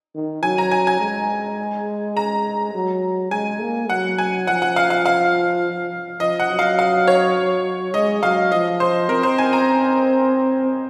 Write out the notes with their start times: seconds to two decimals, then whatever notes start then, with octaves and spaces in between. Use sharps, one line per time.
0.15 D#3
0.43 F#3 G#5
0.58 A#5
0.71 G#5
0.87 G#5
1.00 G#3
2.17 A#5
2.74 F#3
3.31 G#3 G#5
3.61 A#3
3.90 F#3 F#5
4.18 G#5
4.47 F3 F#5
4.62 F#5
4.76 F5
4.90 F5
5.06 F5
6.20 F3 D#5
6.40 F#5
6.50 F#3
6.59 F5
6.79 F5
7.08 C#5
7.94 G#3 D#5
8.23 F#3 F5
8.52 F3 D#5
8.80 C5
9.09 C4 A#4
9.23 C5
9.38 G#5
9.53 A#5